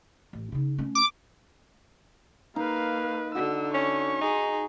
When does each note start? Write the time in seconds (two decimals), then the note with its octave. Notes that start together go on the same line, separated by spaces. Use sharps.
0.33 A1
0.52 C#3 D#4
0.78 A3 C#4
0.95 D6
2.56 A#3 D#4 B4 F5
3.35 D3 F#4 E6
3.74 C#4 C#6
4.21 D#4 G#4